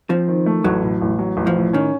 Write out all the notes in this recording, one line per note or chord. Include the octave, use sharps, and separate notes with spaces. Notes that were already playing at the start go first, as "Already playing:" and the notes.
F3 C4
D#3
A3
A1 F#3
A2
A1
F#3
A1
F3
A2
D#3 C#4